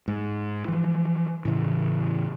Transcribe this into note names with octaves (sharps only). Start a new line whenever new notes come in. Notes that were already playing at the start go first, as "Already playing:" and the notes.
G#2
E3 F3
A2 C#3 E3